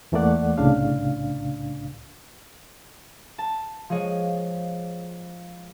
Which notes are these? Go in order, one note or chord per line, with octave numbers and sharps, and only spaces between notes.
E2 E3 A3 A#3 D5 F#5
C2 A2 C#3 D4 F5
A5
F3 G#3 G#4 C#5 D#5